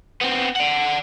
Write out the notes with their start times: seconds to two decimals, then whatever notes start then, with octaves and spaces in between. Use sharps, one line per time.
0.21 B3 C4
0.56 D5 F#5